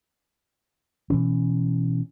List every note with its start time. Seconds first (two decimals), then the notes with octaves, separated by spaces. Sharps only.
1.10 B2 E3 C#4